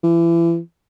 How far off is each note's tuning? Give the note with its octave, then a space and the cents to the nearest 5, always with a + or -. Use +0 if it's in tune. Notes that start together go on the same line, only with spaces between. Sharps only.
E3 +30